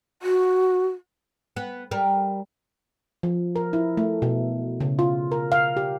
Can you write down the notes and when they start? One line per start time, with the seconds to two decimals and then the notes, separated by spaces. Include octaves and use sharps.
0.22 F#4
1.56 B3
1.91 G3 A#4
3.23 F3
3.56 A#4
3.73 E4
3.97 A3
4.22 B2
4.80 C#3
4.99 F4
5.32 A#4
5.52 F5
5.77 G4